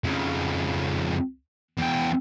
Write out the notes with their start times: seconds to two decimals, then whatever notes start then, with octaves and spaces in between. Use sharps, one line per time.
0.04 F2 C#3
1.78 E2 G5